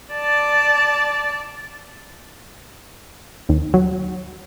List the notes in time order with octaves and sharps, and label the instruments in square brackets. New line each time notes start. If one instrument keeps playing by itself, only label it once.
[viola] D5 A5
[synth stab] D#2
F#3